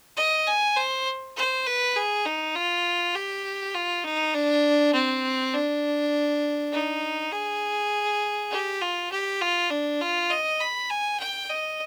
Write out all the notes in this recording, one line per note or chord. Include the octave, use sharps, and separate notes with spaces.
D#5
G#5
C5
C5
B4
G#4
D#4
F4
G4
F4
D#4
D4
C4
D4
D#4
G#4
G4
F4
G4
F4
D4
F4
D#5
B5
G#5
G5
D#5